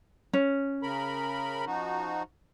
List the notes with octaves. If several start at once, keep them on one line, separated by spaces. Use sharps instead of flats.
C#4
C#3 A#4 B5
F3 D#4 F#4